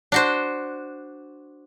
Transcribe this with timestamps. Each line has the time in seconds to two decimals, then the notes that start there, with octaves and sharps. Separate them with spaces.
0.12 D4 F#4 C5